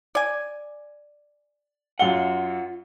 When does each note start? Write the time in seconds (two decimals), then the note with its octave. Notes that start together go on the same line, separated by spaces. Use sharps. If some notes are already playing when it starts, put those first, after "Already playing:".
0.15 D5 G#5
1.99 F#2 F4 F5 F#5 G7